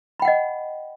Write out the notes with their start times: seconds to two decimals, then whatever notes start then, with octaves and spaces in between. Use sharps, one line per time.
0.20 B5
0.22 G5
0.25 F#5
0.28 D#5